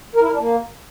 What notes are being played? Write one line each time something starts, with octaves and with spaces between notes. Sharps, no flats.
A#4
E4
A#4
D4
A#3